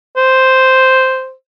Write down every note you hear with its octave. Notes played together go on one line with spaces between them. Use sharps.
C5